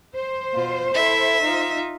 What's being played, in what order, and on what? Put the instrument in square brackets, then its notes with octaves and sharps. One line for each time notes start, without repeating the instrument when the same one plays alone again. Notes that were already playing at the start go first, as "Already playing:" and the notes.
[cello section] C5
[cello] B2 F4
[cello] E4 A4 [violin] E5
[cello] D#4 F4